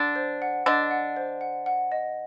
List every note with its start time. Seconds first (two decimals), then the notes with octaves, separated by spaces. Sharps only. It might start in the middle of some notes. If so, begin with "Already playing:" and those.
Already playing: D3 D4
0.16 C5
0.42 F#5
0.66 D3 D4 D#5
0.91 F#5
1.17 C5
1.41 F#5
1.66 F#5
1.92 D#5